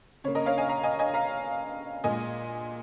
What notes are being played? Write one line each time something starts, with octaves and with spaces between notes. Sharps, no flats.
C#3 A#3 C#5
A#4 D#5
C#5 F5
D#5 G#5
F5 A#5
D#5 G#5
D#5 G#5
F5 A#5
A#2 G#3 D#5 G#5